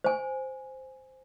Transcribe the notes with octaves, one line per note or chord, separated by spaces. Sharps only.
C5 G#5